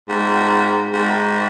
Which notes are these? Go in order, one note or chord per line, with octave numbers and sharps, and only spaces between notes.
G#2
G#2